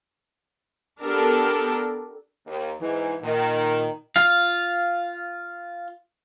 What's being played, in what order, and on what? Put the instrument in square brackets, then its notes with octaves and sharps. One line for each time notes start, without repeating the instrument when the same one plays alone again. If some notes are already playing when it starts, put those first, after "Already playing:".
[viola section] B3 D4 G4 A4 A#4
[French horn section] D#2
[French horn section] G#2 [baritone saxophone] E3
[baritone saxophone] A#2 [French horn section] D#3
[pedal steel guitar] F4 F5